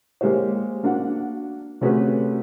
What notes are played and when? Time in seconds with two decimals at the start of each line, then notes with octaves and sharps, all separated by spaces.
0.21 G#3 A#3 G4 C5 C#5
0.83 A#3 D4 F#4 F#5
1.81 C3 A3 C#4 F#4 G#4 B4